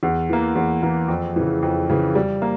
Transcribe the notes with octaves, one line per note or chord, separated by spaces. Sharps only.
E2
E3 A#3
E2
E3 A#3
F2
C#3 E3
F2
C#3 E3
G3
A#3